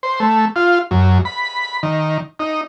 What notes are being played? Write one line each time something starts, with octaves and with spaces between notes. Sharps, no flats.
C5
A3
F4
F#2
B5
D#3
D#4